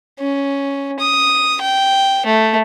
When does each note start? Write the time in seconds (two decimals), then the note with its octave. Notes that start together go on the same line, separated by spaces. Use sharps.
0.19 C#4
1.00 D#6
1.61 G5
2.26 A3